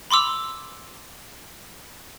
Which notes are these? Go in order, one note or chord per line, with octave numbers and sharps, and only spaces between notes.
B5 C6 D6 E6 F7